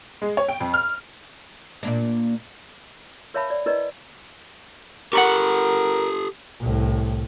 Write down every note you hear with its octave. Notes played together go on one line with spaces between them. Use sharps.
G#3
C#5
G5
F2
F6
A#2 A#3 D4
A#4 C#5 E5 F5 A5 B5
D5
E4 A#4 B4 D5 D#5
G4 A4 A#4 F#5 B5 C#6
C2 A2